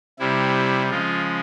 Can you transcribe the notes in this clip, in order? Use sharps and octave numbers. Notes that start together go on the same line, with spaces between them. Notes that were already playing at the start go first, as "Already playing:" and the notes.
C3 G3 E4
C#3 F3 G#3 F4